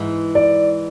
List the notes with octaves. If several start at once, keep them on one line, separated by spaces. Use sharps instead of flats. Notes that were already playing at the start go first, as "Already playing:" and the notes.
Already playing: G#2 E3 G#3
D5